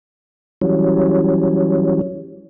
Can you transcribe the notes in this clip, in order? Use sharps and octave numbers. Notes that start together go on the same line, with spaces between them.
E3 F#3 G3 C#4